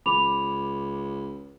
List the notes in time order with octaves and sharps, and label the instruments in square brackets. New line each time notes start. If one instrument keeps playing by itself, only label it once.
[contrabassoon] C#2 [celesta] B5 D6 F7